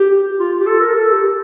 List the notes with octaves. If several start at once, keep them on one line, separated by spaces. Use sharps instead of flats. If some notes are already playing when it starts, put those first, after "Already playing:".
Already playing: G4
F4
G4
A4
A#4
A4
G4